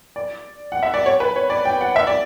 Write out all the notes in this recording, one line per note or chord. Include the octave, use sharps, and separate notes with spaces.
D5
F#5
E5
D5
C#5
B4
C#5
D5
G5
F#5
E5
D5